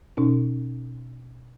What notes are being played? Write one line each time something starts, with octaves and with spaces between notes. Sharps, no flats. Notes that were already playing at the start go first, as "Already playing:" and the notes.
B2 C#4 D#4